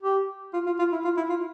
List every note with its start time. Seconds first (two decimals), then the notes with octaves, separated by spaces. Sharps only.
0.02 G4
0.54 F4
0.66 F4
0.79 F4
0.92 E4
1.05 F4
1.17 E4
1.30 F4